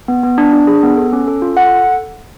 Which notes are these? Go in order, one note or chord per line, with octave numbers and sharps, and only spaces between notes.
B3
B3
D4
D4
G#4
B3
A4
C#4
A4
F4
A4 F#5